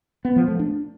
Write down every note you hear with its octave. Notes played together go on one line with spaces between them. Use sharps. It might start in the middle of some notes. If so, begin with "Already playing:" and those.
B3
F3
A3
D4